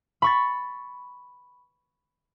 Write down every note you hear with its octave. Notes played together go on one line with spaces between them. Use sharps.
B5 C#6 A6